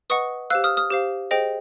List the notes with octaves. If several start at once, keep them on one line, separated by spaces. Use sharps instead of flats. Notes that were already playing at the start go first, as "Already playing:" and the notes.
B4 D#5 F#5 C#6 D#6
G4 C5 F5 E6 F#6
D#6 F6
D#6 F6
G4 C5 F5
G#4 C5 D#5 G5